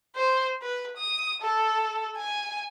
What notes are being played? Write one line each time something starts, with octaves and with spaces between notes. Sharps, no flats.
C5
B4
D#6
A4
G#5